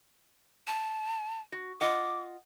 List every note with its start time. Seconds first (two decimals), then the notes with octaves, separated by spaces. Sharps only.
0.67 A5
1.52 F#4
1.81 F4 D#5 F#5 D6